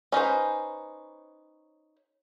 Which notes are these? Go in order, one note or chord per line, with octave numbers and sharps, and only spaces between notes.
C#4 D#4 B4 C5